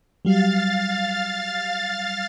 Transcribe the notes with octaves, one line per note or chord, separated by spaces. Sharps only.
F#3 G3 F5 A6